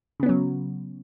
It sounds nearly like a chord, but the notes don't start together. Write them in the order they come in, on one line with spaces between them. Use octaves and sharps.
C#3 B3 C#4 F#3